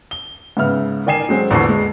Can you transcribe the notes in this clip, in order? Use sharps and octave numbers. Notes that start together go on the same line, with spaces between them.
G7
G#2 C#3 B3 E5 F6
D#3 D5 G5 G#5 C7 E7
F#3 G#3 C4 C5
A#1 E2 D3 A4 C#6 C7
G#3